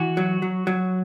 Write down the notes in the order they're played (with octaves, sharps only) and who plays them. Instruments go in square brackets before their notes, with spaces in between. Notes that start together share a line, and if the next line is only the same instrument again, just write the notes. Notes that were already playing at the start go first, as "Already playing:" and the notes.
Already playing: [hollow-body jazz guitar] E3 [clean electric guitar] F#4
[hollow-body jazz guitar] F#3
F#3
F#3